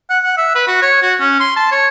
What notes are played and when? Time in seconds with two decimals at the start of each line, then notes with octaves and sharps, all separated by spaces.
0.10 F#5
0.24 F#5
0.37 E5
0.55 B4
0.67 F#4
0.82 C#5
1.02 F#4
1.20 C#4
1.40 C6
1.56 A5
1.72 C#5